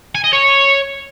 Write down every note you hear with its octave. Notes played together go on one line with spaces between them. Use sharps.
G#5
D#5
C#5